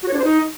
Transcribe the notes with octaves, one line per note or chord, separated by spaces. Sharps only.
F#4
C#5
D4
C5
D#4